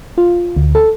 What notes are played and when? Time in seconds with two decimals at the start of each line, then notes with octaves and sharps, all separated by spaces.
0.18 F4
0.57 D2
0.75 A4